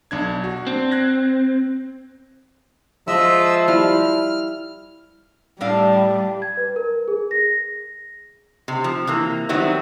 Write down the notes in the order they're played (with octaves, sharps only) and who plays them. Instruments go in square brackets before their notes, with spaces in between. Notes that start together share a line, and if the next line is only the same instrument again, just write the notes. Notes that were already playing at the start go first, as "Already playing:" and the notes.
[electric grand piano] B1 D4 G#6
F#4
[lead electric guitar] C4 [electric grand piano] D4
[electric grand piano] F#6 G#6 A#6
[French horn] F3 [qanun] G#3 [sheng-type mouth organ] D#5 E5 E6
[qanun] G3 E4 [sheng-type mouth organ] F6
[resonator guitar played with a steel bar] A2 D4 F5 [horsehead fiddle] G3
[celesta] G#6
B4
A#4
G#4
A#6
[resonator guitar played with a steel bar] C3
F3
C3 E3 A#3
D#3 F#3 G3 B3 C4 E4